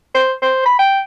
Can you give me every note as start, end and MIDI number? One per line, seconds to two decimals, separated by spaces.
0.14 0.32 72
0.42 0.63 72
0.66 0.75 83
0.79 1.00 79